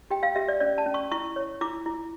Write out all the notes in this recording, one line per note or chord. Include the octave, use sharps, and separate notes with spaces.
G4 G5
F5
G4 E5
D5
C#4 D5
A5
C#4
C#6
E4 C#6
C#5
E4 D6
E4